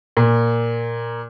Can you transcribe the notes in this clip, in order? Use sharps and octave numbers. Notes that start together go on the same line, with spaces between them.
A#2